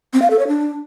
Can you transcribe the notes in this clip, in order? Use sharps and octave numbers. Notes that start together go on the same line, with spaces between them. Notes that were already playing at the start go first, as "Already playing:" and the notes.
C4
F5
A4
C#5
D4